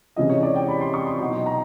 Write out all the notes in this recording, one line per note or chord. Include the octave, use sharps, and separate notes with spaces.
C3 E3 G#3 C#4 E4 D#5
C#5
D5
G5
B5
C6
C#6
C6
B2 F#3 B3 D#4
A#5